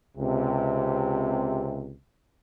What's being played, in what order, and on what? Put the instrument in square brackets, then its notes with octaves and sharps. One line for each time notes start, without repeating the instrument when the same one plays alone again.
[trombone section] C#2 C3